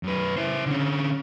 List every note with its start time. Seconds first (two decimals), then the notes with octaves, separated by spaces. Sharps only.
0.03 F#2 B4
0.36 E4 C5
0.66 D3 C#4